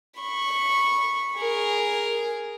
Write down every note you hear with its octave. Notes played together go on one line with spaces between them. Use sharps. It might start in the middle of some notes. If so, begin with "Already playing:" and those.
B5 C#6
G#4 A#4